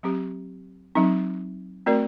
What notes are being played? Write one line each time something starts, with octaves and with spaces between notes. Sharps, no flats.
F#3 C4 G4
F#3 C4 D#4
A3 C4 F#4 A#4 D5